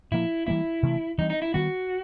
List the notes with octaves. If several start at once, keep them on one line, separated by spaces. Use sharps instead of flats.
A#2 F3 A#3 E4
E3 G3 A#3 E4
C3 E3 A3 C4
E3 G3 C4 D#4
D#4
E4
D#3 G3 B3 F#4